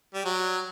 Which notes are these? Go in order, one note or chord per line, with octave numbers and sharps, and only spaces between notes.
G3
F#3